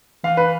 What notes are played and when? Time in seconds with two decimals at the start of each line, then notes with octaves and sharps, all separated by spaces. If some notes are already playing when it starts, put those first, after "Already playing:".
0.24 E3 F5
0.37 B4